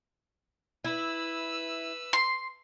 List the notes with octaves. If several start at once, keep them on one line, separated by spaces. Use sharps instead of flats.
E4 B4 E6
C6